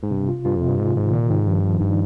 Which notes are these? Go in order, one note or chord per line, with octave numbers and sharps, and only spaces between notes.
G#2
G2 C3
F4
G2 F4
F2
C3
G2
G#2 F4
G#2 D#3
A#2 D#3
G#2 D#3
G2 F3
F3
G2 D#4